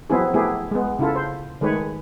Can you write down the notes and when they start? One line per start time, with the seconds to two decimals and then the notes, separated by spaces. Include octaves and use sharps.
0.10 F3 F#3 B3 C4 E4 G#4
0.34 A3 B3 E4 G4 G#4
0.71 G#3 B3
0.99 C#3 E4 F4 A4
1.15 C5
1.61 D#3 G#3 A3 B4 C#5